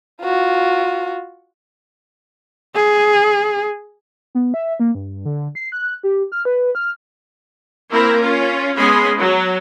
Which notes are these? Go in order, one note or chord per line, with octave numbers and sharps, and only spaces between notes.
F4 F#4
G#4
B3
E5
A#3
G2
D3
C7
F#6
G4
F6
B4
F6
A#3 C4 E4 A#4
C#4 F4
G#3 B3 C#4 G#4 B5 C6
F#3